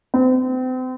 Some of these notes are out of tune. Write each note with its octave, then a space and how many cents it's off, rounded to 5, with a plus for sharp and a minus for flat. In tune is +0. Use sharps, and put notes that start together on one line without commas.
C4 -35